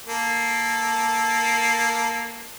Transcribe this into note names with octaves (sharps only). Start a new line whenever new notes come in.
A#3 A4